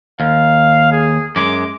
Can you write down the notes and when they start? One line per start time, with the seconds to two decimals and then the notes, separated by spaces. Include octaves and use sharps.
0.20 D#2 F5
0.92 G#4
1.36 F#2 G#3 D6